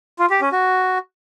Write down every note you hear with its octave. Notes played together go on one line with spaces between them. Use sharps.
F4
G4
C#4
F#4